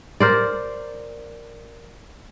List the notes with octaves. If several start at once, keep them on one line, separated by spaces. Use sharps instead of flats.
A#4 C5 D5